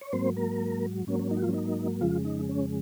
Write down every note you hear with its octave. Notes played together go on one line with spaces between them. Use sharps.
C#5
G#2 F#3 A#3 C4 C5
A#3 A#4
G#2 F#3 A#3 C#4
C#4
D#4
F#4
F3 F4
C#4
D#4
F2 C#3 F3 G#3 F4
D#4
C#4